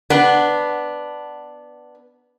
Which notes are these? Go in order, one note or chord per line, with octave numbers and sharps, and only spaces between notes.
B3 D4